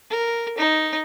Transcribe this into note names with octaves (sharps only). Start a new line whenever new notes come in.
A#4
D#4